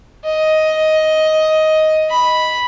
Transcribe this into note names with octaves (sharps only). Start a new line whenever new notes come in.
D#5
B5